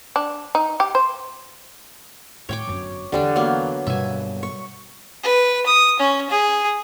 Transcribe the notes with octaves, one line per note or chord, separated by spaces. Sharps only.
D4
D#4
G4
C5
A2 C#5 G5 D6
G1 F#2
E2 D3 G3 D4
F#3 A#3 B3
G2 B2 E5 G#5
C#6
B4
D#6
C#4
G#4